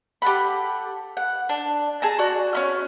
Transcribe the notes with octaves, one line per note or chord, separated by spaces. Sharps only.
G4 A4 F#5 B5
F#5
D4
G#4 A5 A#5
F#4 D5
C#4 E4 F6